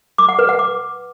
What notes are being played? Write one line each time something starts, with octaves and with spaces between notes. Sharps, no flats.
D6
F#5
B4
F#5
D6